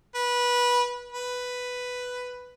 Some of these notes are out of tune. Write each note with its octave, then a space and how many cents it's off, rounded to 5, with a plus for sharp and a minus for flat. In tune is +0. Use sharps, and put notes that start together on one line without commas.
B4 -15
B4 +5